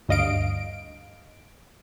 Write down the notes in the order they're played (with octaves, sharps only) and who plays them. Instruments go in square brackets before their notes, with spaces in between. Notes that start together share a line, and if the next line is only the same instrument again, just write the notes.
[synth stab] D2 G2 D#5 F5 D7